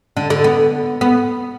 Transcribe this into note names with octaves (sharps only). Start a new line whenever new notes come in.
D3
D3
B3
B3